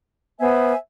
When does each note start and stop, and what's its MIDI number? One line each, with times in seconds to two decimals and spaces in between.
0.40 0.72 59
0.40 0.75 72
0.40 0.75 76
0.40 0.75 80